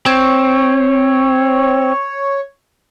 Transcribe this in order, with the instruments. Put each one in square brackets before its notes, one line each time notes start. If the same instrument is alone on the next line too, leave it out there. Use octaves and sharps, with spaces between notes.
[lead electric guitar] C4 [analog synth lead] C#5